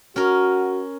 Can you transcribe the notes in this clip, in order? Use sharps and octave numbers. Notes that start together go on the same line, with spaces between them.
C#4 F#4 A#4